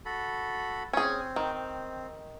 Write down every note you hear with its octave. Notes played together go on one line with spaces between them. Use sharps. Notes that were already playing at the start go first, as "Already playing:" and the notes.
F#4 A4 B5
C4 C#4 G#4
D#3
C4